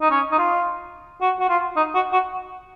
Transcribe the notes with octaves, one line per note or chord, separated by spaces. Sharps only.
D#4
C#4
D#4
F4
F#4
F#4
F4
D#4
F#4
F#4